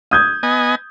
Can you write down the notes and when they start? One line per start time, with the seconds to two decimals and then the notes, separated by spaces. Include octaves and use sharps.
0.11 D#6 G6 G#6
0.43 B3 D#5 G#5